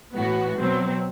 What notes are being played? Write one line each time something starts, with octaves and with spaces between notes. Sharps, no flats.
A2 E3 B3 F#4
B2 F#3 C4